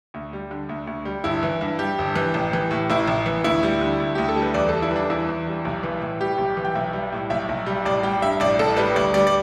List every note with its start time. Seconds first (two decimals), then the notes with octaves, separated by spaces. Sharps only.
0.14 D2
0.33 G3
0.51 D3
0.69 D2
0.87 D2
1.05 G3
1.24 G1 E4
1.43 E3
1.61 G2
1.79 G3 G4
1.98 G1
2.16 E3
2.34 A1
2.53 E3
2.71 A2
2.90 A1 E4
3.08 A1
3.26 E3
3.44 D2 E4
3.63 G3
3.81 D3
4.00 D2
4.15 D2 G4
4.29 A4
4.36 G3
4.42 B4
4.54 E2 D5
4.69 G3 A4
4.82 E4
4.91 E3 D4
5.10 E2 E4
5.29 E2
5.47 G3
5.65 B1
5.83 E3
6.01 A2
6.20 G3 G4
6.38 B1
6.57 E3
6.65 G5
6.75 B1 E5
6.93 G3
7.12 A2
7.30 B1 E5
7.49 B1
7.66 G3
7.85 A1 D5
8.03 G3 G5
8.22 G2 E5
8.40 A1 D5
8.59 A1 A4
8.77 G3 B4
8.96 D2 D5
9.14 G3 D5
9.27 D5